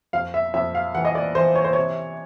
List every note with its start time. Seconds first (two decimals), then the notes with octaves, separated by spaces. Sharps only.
0.13 F2 F5
0.34 E5
0.54 F2 E5
0.75 F5
0.95 E3 F#5
1.05 D#5
1.15 D5
1.35 E3 C5
1.55 C#5
1.64 C5
1.73 C3 C#5